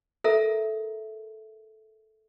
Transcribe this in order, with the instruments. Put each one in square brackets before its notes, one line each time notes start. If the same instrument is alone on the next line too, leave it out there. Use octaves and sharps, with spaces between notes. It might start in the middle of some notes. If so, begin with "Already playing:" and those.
[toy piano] A4 A#4 E5 A#5